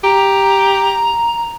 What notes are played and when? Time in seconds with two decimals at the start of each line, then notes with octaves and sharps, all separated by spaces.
0.04 G4 A#5